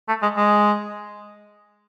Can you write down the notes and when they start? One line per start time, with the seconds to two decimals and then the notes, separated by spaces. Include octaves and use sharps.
0.08 A3
0.22 G#3
0.37 G#3